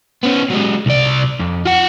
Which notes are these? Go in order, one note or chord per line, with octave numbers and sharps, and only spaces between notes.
B3 C#4
F#3 G#3
C2 D5
F2
F4 F#5